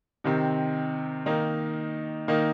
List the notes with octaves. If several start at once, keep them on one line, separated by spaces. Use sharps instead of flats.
C3 D#3 C4
D#3 A#3 D#4
D#3 A#3 D#4